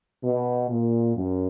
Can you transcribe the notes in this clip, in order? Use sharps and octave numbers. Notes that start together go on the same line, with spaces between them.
B2
A#2
F#2